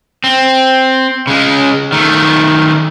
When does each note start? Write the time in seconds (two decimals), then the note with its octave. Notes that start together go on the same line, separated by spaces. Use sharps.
0.24 C4
1.27 C#3 G#3
1.92 D#3 A3